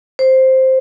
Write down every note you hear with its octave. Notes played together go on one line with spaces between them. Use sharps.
C5